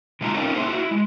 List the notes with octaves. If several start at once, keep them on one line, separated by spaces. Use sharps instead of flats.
C3 G#3 D#4 F4 A#5
A3 C4 C#4 D#4 F4 A#4
A#3 E4 G#4 C5
E4 F#4
E4
G#3